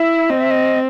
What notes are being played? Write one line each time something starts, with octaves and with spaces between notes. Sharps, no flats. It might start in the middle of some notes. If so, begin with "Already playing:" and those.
Already playing: E4 E5
C4 D#5
E5
D#5